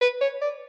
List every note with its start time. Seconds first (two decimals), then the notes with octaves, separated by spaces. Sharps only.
0.01 B4
0.21 C#5
0.42 D5